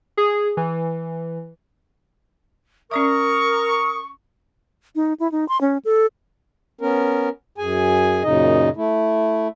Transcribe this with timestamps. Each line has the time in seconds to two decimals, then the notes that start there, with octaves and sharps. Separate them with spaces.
0.17 G#4
0.57 E3
2.91 C#4 A#4 D5 E5 C#6 D#6
4.95 D#4
5.20 E4
5.32 D#4
5.48 C6
5.61 C#4
5.85 A4
6.81 B3 C#4 A#4
7.58 F#2 G#4 G#5
8.24 F#2 A#2 C#3 D#4 D#5
8.77 A3 E4